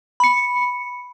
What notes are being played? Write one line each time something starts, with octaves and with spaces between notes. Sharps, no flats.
B5 C#7